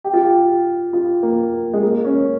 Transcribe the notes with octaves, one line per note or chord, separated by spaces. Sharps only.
G4
F4
G4
F4
A#3
G#3
A#3
C#4